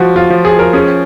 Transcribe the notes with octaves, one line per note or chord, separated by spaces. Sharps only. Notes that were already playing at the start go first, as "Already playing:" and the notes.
Already playing: F3 F#4
F4
F3
G#4
A#4
C#4 G#4